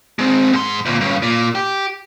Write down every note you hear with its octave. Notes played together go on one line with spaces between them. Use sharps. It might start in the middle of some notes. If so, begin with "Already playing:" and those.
G#3 C4
G#2 C6
D2 A#2
G2 C#3
A#2
G4